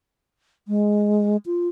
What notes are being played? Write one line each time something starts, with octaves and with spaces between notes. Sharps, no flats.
G#3
F4